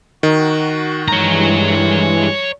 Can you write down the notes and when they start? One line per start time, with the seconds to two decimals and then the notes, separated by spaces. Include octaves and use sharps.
0.23 D#3 F#4
1.08 G2 E3 G#3 C#5 A#5